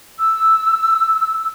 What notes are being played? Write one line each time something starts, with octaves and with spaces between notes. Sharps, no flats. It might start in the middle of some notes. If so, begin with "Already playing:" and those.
E6